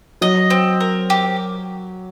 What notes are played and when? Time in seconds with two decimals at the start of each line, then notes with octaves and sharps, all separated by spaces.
0.21 F#3 D#5
0.50 C4
0.80 A#4
1.10 G4